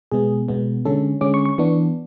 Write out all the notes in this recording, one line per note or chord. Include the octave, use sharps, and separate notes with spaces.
B2 G#3 B3 G#4
B2 G#3 B3
D3 G#3 C#4 A4
D3 G#3 C#4 D6
C#6
C#6
E3 B3 D4